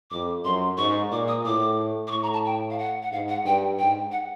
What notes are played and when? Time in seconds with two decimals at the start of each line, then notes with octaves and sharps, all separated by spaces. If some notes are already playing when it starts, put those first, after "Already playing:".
0.11 F2 D6
0.45 F#2 C6
0.78 G#2 C#6
1.11 A#2 D6
1.28 D#6
1.45 A2 D6
2.07 D6
2.11 A2 C#6
2.23 A#5
2.33 A5
2.46 G5
2.70 F5
2.79 F#5
3.03 F#5
3.12 G#2 F5
3.28 F#5
3.45 G2 G5
3.79 G#2 G5
4.12 F#5